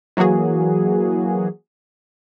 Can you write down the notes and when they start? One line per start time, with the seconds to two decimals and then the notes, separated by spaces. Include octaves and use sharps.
0.17 E3 F#3 A#3 F#4 G#4